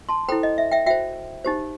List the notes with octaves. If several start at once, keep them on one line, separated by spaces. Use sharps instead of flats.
A5 C6
E4 A4 C5 G5 B5
D#5
E5
E5 G5
F#4 C5 E5 G5
D#4 G4 C5